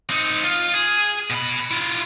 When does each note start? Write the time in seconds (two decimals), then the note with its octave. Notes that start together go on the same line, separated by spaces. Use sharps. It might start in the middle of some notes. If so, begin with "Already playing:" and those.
0.10 C4 D#4
0.44 F4
0.74 G#4
1.30 B2 B5
1.71 E4 F4